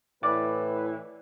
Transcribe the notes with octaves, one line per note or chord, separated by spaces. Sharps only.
A2 E3 B4 D5 D6